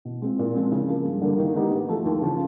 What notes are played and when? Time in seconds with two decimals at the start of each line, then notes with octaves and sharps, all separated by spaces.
0.05 B2
0.22 G#3 C4 F4
0.39 A#2
0.55 F3 G#3 C4
0.72 C#3
0.88 F3 A#3
1.05 G2
1.22 D3 G3 A#3
1.38 D#3
1.55 G#3 B3 D#4 G4
1.71 G#2
1.88 F3 A3
2.05 D#2
2.21 C#3 F3